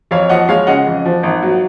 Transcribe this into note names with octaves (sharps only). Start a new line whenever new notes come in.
F2 C#5 F5
F3 D#5 F#5
G#3 C#5 F5
C#3 D#5 F#5
F2
F3
G#1
F#3